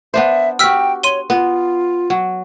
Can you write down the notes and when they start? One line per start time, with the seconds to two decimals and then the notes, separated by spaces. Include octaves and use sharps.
0.14 B3 D4 C5 E5
0.59 F#4 G4 G5 E6 F6 B6
1.03 C#5 C6 D#7 G7
1.30 B3 F4
2.10 F#3